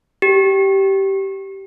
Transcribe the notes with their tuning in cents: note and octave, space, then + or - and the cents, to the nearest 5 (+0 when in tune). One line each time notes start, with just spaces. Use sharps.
G4 -15